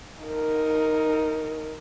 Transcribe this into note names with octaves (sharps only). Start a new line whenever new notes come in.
D#4 A#4